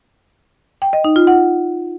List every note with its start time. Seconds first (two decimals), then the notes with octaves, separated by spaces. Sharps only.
0.82 G5
0.93 D#5
1.04 D#4
1.16 F4
1.27 F#5